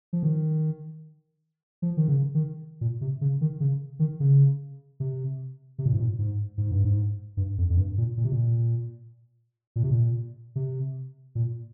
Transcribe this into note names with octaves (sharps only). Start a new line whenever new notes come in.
F3
D#3
F3
D#3
C#3
D#3
A#2
C3
C#3
D#3
C#3
D#3
C#3
C3
C3
A#2
G#2
A#2
G#2
G#2
G2
G#2
G2
F2
F2
G2
A#2
A#2
C3
A#2
A#2
C3
A#2
C3
A#2